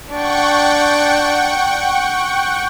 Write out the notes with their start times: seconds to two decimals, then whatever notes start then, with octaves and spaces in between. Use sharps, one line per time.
0.11 D4 F#5 G5 C#6